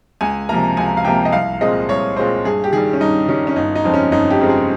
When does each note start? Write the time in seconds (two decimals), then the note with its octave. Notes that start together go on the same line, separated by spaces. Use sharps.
0.21 C#2 G#5
0.49 C3 F3 A#3 A#5
0.77 C#2 G#5
0.97 F5
1.05 C3 F3 A#3 G5
1.25 D#5
1.32 C2 F5
1.61 A#2 G#3 C4 D#5
1.89 C2 C#5
2.16 A#2 G#3 C4 C5
2.45 G2 G#4
2.64 G4
2.73 D#3 G3 G#4
2.93 C#4
3.00 G2 D#4
3.28 D#3 G3 C#4
3.47 C#4
3.56 G1 D#4
3.75 D#4
3.84 F2 C#3 G#3 C4
3.94 C#4
4.12 G1 D#4
4.31 G4
4.40 F2 C#3 G#3 C4
4.49 G#4